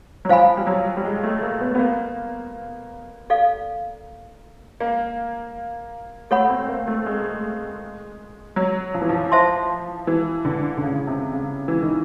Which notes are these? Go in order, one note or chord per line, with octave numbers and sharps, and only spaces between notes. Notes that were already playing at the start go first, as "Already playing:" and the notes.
F#3
F3 C5 F5 G#5 B5
G3
F#3
G3
G#3
A3
A#3
B3
B3
A#3
A4 D5 F5
A#3
A3 A4 C#5 F#5 B5
C4
A#3
A3
G#3
F#3
F3
E3
F3
C5 E5 A5 C6
E3
D3
D3
C#3
C3
C#3
E3
D#3